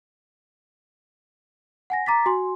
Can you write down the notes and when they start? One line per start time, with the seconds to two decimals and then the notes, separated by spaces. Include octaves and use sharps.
1.90 F#5 G#5 A#6
2.06 A#5 D6 A6 B6
2.26 F#4 G#5 C6